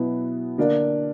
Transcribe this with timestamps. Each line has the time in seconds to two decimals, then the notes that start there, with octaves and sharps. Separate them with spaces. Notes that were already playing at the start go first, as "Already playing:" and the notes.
Already playing: B2 F#3 B3 E4
0.58 D3 A#3 D4 A#4 D5